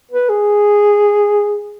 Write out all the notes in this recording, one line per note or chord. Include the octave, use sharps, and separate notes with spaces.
B4
G#4